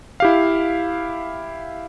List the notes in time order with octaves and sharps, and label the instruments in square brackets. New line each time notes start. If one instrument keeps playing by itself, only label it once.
[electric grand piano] E4 G4 F5